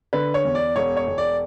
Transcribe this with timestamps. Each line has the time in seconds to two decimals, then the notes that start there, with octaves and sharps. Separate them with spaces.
0.13 D3 B4
0.34 C#5
0.45 E2
0.55 D5
0.76 E1 C#5
0.97 C#5
1.07 E1
1.18 D5